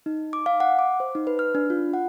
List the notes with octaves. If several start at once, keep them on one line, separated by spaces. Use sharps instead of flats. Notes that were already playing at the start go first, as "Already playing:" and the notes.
D#4
D6
F5
F#5
D6
C5
D#4
B4
F6
D4
F4
F#5